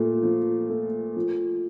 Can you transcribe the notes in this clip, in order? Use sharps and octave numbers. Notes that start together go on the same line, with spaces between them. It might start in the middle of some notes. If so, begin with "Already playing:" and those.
Already playing: A#2 A3
F3
A3
F3